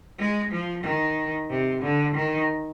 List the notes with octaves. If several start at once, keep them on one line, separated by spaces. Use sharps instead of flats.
G#3
F3
D#3
C3
D3
D#3